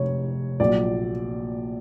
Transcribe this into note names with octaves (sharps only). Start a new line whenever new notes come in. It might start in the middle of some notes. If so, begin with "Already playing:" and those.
Already playing: F1 C#5
A#1 A#2 F#3 D5